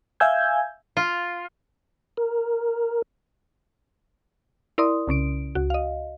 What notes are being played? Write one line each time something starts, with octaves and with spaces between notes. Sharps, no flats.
E5 F5 G#5 E6 G6 G#6
F4
A#4
E4 A#4 D5 C6 D#6
C2 C#3 C#4 D7
C#2 F#4
D#5 F5